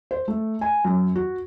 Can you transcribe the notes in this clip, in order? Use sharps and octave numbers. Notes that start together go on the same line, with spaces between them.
C5
A3
G#5
F#2
F#4